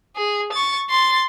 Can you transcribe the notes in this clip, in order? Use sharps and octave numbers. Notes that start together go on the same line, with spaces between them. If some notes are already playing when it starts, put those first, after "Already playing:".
G#4
C#6 A6
C6 A6